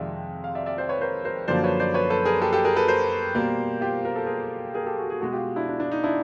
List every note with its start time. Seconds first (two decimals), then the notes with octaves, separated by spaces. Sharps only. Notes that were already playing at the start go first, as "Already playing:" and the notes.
Already playing: F2 C3 D#3 G#3 D5 E5 F5
0.44 F5
0.55 D5 E5
0.66 D5 E5
0.78 C5 D5
0.89 B4 C#5
1.01 A#4 C5
1.25 A#4 C5
1.48 F#2 D3 F3 A#3 C5 D5
1.64 B4 C#5
1.80 C5 D5
1.94 B4 C#5
2.10 A4 B4
2.25 G#4 A#4
2.42 G4 A4
2.52 G4 A4
2.64 G#4 A#4
2.76 A4 B4
2.87 A#4 C5
3.35 B2 G3 A#3
3.81 F4 G4
4.05 A#4
4.16 A4
4.26 G#4 A#4
4.74 G#4 A#4
4.86 G4 A4
4.98 F#4 G#4
5.10 F#4 G#4
5.21 B2 G#3 F#4 G#4
5.33 F4 G4
5.56 D4 E4
5.69 D4
5.80 D4
5.91 D#4
6.04 D4 E4